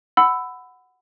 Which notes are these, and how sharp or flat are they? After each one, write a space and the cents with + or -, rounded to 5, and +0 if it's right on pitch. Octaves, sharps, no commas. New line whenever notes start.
F#5 +0 B5 +20 E6 +0